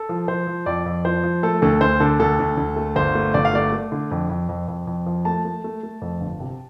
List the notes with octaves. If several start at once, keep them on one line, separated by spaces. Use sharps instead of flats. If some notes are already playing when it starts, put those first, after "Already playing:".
Already playing: A4
F3
F3 C5
F3
F2 D5
F2
F3 C5
F3
A3 A4
D2 A4
D2 C5
D3 A4
D2 A4
D2
D2
A3
G1 C5
A3
G1 D5
F5
A3 D5
A3
D3
F2
F2
F2
F2
F2
F3
A3 A5
A3
A3
A3
F2
G1
C3